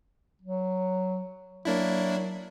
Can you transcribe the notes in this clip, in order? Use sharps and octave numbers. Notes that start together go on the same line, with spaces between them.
F#3
F#3 A#3 D4 E4